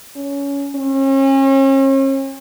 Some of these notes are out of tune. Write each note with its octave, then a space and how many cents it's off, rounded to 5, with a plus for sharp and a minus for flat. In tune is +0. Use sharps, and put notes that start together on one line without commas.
C#4 +20
C#4 -40